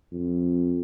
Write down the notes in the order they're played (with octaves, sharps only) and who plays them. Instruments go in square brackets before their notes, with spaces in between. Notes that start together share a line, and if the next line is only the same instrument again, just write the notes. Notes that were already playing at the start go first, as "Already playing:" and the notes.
[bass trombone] F2